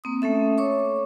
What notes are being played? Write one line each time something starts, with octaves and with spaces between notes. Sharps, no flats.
A#3 C4 D#6
A3 C#4 A4 E5
C#5 C#6 D6